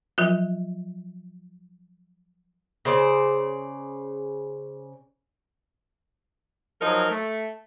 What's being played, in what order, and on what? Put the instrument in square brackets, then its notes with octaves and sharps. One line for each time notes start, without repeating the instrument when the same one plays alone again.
[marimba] F3 F#3 F4
[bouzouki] C#3 C5 D5
[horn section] F3 F#3 D#4 A#4
A3